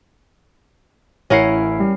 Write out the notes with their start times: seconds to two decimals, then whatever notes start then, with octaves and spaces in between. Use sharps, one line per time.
1.30 A1 C#4 E4 A#4 F#5 C7
1.80 G3